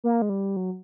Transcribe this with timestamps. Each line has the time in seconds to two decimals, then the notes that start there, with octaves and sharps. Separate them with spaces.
0.04 A#3
0.22 G#3
0.29 G3
0.56 F#3